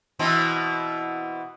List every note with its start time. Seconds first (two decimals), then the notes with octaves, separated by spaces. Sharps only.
0.19 B2 E3 C4